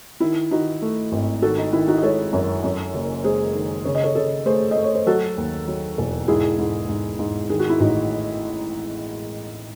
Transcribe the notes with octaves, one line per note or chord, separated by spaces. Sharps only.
D#3 E4
D#3 D#4 F#4
A3
G#1
D#3 F#4 A4
D#4
D#3 E4
D#4 F#4
D#5
G#3 A4 C#5
F#2
F#2
F#1
G#3 G#4 C5
D#3
C#3 C#5
D#5
A4 C#5
C#3 A4 C#5
A3 G#4 C5
D#5
A3
C#5
C5
F#3 F#4 A4
D#2
F#3
E1
G#2 E4 G#4
G#2
G#2
G#2
D#3 G#4
F#4
E4
A1 D#4 F#4